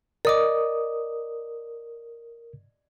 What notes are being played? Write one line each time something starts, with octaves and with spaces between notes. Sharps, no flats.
A#4 D5 D#5 D6 D#6